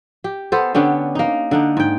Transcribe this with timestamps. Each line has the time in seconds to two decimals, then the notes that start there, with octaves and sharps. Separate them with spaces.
0.24 G4
0.52 B3 A4 C5
0.75 D3 B3 C#4 G4
1.15 A#3 D#4
1.51 D3 D4 D#4
1.77 G#2 G5